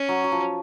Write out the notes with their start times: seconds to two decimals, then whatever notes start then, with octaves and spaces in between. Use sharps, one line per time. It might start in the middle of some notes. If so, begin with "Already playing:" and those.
Already playing: C#4
0.09 F#3
0.24 F#3
0.32 F3